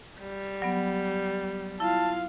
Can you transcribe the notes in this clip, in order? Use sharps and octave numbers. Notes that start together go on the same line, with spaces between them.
G3
F#3 B3
E4 F4 F5 A5